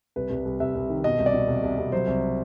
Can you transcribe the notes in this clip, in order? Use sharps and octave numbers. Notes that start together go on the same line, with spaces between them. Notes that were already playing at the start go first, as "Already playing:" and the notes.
C2 B4
C2
C2
C2 E5
C2
D#3
B2 D#5
C2
D5
B2
C2
C2
C2
F#3 C5
C2